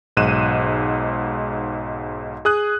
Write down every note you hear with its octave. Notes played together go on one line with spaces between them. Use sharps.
B1 G#2 F#6 D#7 E7
G#4 D#6 F#6